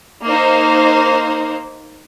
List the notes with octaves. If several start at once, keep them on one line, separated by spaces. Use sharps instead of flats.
A#3 D#4 C5